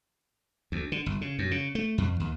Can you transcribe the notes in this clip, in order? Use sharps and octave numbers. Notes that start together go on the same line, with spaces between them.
D2
D3
G1
C#3
F#2
C#3
A3
F2
D#2